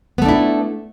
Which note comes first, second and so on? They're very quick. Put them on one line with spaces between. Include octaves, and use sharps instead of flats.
B3 A3 D4 E4